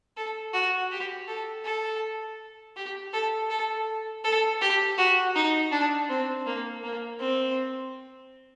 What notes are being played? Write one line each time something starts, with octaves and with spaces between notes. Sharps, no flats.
A4
F#4
G4
A4
A4
G4
A4
A4
A4
G4
F#4
D#4
D4
C4
A#3
A#3
C4